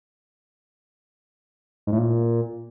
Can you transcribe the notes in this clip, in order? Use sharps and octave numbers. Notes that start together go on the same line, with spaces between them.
G#2
A2
A#2